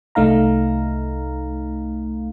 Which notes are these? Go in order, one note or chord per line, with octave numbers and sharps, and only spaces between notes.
C2 A3 D#4 F5 A#5